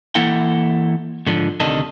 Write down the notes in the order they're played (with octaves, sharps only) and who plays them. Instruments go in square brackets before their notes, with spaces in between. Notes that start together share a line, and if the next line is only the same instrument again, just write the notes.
[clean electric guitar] E3 A#3 E4 A4 F#5 G5
G#2 D3 F3
D2 C3 D#3 D4 A4 D#5